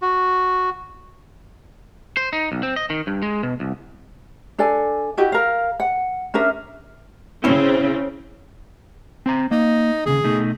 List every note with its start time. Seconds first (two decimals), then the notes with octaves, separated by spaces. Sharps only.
0.02 F#4
2.17 C5
2.33 D#4
2.52 B1
2.63 C4
2.76 D#5
2.90 D#3
3.07 G2
3.22 G#3
3.43 B2
3.60 C2
4.58 D4 A4 D5 G#5
5.17 E4 F#4 G4 D#5
5.32 A#4 F5
5.80 F#5
6.34 C#4 D4 A#4 E5
7.44 C#3 C4 C#4 E4
9.26 C4 C5 A#5
9.51 A#3 D#4
10.06 D#2 A#2 C#3 G#4
10.24 B2 A3 D#4